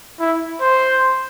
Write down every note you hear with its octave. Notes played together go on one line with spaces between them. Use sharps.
E4
C5